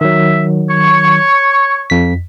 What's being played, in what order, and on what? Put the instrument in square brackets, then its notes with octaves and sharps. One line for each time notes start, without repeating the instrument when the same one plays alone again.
[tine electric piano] D#3 F#3 [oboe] E5
[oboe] C#5 [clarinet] C#6
[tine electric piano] F2 B6